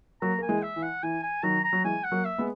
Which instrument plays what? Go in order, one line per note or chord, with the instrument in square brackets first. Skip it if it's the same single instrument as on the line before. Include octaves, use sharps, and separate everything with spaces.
[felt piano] F#3 A#3 [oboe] A#5
[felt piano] A#3 [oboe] G#5
[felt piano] E3 G#3
[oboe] E5
[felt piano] E3
[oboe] F#5
[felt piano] E3 [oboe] G#5
[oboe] G#5
[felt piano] D#3 F#3 [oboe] A#5
[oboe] A#5
[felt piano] F#3
[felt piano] E3 G#3 [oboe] G#5
[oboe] F#5
[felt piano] F#3 A#3
[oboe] E5
[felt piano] G#3 B3